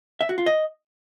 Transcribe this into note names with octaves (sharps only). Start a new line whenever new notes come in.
E5
F#4
F4
D#5